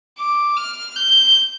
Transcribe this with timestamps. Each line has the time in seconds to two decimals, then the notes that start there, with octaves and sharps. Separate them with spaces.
0.18 D6
0.56 F6
0.96 G6